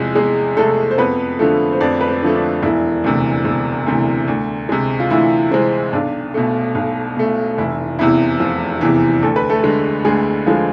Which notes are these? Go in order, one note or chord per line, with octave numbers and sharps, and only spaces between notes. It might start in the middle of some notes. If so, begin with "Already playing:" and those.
Already playing: E2 C3 F3 G#3
E2 G#3 G#4
C3 G#3 A3 A4
C5
F2 B3 B4
D3 F3 A3
C5
F2 D4 D5
B4
C4 C5
D3 F3 A3
D4
E1 E3 E4
D2 C3 E3
E1
D2 C3 E3
D2
C3 G#3
F4
D2 E3 E4
C3 G#3 C4
B1 D4
B2 A3
B1
B2 A3
F1 E3 E4
E2 C3 E3 E4
F1 F3 F4
E2 C3 E3
D2 A4
B4
A3 A4
D3 G#3
D2 G#3 G#4
D3 F3 G#3 F4